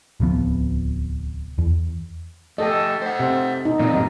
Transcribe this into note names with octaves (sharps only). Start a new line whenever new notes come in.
D1 C2 F3 B3
E2
A3 G4 A4 D#5
C5 F#5
C3 C4
D#4
A#2 E3 C4 D#5
G2 F#3 D#4